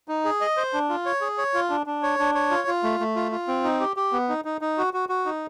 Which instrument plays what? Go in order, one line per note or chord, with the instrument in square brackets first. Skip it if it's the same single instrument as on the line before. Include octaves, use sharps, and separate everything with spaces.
[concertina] D#4
G#4
D#5
C5
D4
F4
C#5
G#4
C#5
F4
D4
D4
C#5
D4
C#5
F4
F4
A3
A3
F4
F4
C4
D#4
G4
G4
B3
D#4
D#4
D#4
F#4
F#4
F#4
D#4